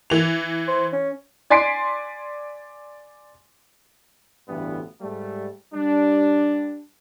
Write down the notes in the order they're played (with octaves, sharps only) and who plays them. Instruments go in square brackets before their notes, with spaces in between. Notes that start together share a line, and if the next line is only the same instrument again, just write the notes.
[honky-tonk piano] E3 F7
[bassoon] C5
C#4
[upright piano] D5 G#5 C6 B6 C7 D7
[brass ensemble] A1 D2 G2 E3 B3
G#2 G3 A3
G3 D4